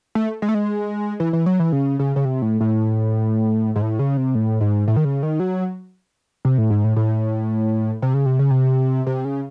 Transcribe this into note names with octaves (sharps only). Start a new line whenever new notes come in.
A3
G#3
A3
G#3
E3
E3
F#3
E3
C#3
C#3
C#3
C3
A2
A2
G#2
A2
C#3
C3
A2
G#2
A2
D#3
C#3
D#3
F#3
C3
A2
G#2
A2
A2
C3
C#3
C3
C#3
C3
C3
C#3